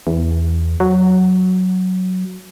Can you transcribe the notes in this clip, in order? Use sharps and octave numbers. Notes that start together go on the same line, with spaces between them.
E2
F#3